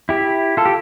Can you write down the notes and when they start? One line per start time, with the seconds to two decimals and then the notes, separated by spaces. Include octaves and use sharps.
0.09 E4 G4
0.57 F4 A4
0.66 G4